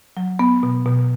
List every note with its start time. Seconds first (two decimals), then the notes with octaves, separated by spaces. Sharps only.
0.17 F#3
0.39 B3
0.63 B2
0.86 B2